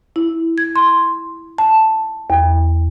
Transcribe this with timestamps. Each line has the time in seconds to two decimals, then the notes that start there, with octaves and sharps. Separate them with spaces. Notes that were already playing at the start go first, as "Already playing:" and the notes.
0.16 E4
0.58 G#6
0.76 C6
1.58 A5
2.30 E2